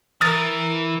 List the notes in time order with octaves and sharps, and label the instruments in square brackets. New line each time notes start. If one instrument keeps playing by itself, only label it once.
[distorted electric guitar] E3 [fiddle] A#4 [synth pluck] D#6 F6 A6